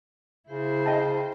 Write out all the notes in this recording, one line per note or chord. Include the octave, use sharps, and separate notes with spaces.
C#3 E4 C5
D#5 G5 A5